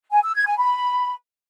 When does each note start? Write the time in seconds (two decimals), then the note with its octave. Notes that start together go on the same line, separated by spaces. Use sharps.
0.12 G#5
0.23 E6
0.35 G#6
0.47 G#5
0.58 B5